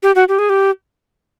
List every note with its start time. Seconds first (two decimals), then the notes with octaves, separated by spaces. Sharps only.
0.03 G4
0.15 F#4
0.28 G4
0.39 G#4
0.49 G4